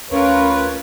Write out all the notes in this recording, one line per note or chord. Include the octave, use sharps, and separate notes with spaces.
D2 C#4 F4 A#4 B4 C#5